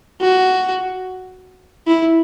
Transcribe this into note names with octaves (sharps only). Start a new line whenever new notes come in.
F#4
E4